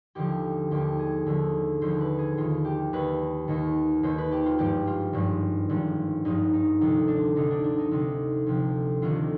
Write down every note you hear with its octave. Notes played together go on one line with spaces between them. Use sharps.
D#2 D3 F3 G4
D#2 D3 F3 G4
G#4
D#2 D3 F3
D#2 D3 F3 C5
B4
G#4
D#2 D#3 F4
G4
D#2 D#3 B4
D#2 D#3
D#2 D#3 C5
B4
G4
F4
G#1 G2 F3 G4
F4
G#1 G2 F3
G#1 G2 F3
G#1 G2 F3 D#4
D#4
D2 C3 F3 D#4
D4
D2 C3 F3 D#4
D4
D4
D#4
D2 C3 F3 D#4
D2 C3 F3
D2 C3 D#3 F4